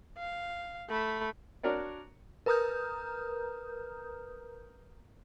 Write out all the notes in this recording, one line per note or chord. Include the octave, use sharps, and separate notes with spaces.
F5
A3 B5
D4 F#4 A#4 C#5 D5
A#4 B4 A#5 D#6 F6 G6